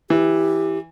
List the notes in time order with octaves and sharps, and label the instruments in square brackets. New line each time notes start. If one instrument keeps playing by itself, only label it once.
[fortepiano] E3 [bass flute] G4